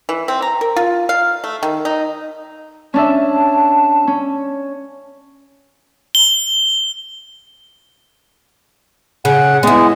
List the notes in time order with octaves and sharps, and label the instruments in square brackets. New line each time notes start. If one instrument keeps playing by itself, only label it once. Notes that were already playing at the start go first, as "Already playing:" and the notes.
[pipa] E3
C4
A#5
A#4
F4
F5
A3
D#3
D#4
[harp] C#4 D4 E5 [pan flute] A5
[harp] C#4
[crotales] G7
[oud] C#3 [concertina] F#5
[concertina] G#3 [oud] B3 E4